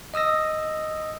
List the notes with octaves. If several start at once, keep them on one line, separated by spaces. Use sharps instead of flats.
D#5 D#6 E6 A#6